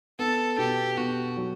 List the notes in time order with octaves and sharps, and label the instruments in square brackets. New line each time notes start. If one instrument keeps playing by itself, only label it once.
[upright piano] B3 [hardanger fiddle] A4
[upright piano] B2 [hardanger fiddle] G4
[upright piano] B2 [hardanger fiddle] F#4
[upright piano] F#3